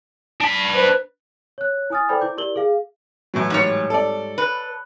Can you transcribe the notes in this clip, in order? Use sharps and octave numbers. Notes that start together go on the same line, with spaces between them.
D4 B5
B4 C5
C#5 F#6
E4 G#5 D#6 F6 A6
A4 B4 C5 D5 G5 B5
E4 D6 G6
E4 G4 A#4 D5 F#7 G7
G#4 F5
A2 E3 F#3
G#2 G3 C#5
A4 D5
B4